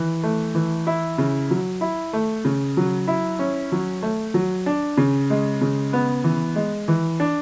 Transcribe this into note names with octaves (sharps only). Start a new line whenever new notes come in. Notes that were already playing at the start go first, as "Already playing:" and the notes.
Already playing: E3
A3
E3
E4
C#3
F#3
E4
A3
C#3
F#3
E4
C#4
F#3
A3
F#3
D4
C#3
G#3
C#3
B3
E3
G#3
E3
D4